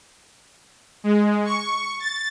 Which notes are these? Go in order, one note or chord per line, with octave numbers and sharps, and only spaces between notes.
G#3
C#6
A6